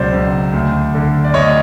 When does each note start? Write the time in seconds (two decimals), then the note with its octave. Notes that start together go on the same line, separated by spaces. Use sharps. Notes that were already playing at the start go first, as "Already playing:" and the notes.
Already playing: C#2 B2 F#3 C5 D5
0.13 C#2
0.53 D2
0.94 D3
1.24 D5
1.34 D2 C#5 D#5